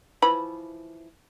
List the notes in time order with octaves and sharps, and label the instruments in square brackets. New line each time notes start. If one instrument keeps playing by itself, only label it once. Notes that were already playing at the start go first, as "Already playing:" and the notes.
[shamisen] E3 F3 B5